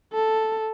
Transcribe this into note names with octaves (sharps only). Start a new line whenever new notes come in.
A4